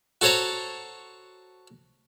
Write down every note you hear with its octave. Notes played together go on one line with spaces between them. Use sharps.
F#4 A4 C5 C#5 A5 A#5